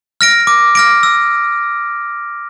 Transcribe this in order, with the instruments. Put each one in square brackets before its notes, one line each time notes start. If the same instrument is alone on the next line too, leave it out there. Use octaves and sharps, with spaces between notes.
[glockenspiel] F6 A#6 D7
D6
F6 A#6 D7
E6